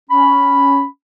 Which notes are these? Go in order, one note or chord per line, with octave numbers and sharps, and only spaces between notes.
C#4 B5